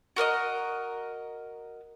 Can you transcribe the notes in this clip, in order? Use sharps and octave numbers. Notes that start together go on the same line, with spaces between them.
F#4 A#4 D5 D#5